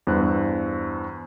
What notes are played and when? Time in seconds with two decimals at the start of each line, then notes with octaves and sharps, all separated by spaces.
0.07 E2 G2 C5 F#6